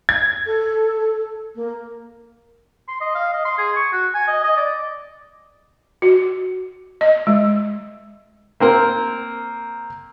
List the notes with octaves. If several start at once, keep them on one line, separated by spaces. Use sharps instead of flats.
G#6
A4
A#3
C6
D#5
F5
D#5
C6
G#4
C#6
F#4
G#5
D#5
D#5
D5
F#4
D#5
G#3
A#3 C4 A#4